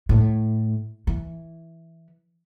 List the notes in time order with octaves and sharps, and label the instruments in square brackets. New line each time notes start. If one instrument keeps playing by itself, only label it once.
[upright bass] A2
E3